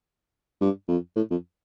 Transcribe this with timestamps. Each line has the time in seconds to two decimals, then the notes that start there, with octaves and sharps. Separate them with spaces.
0.61 G2
0.88 F2
1.16 A2
1.31 F2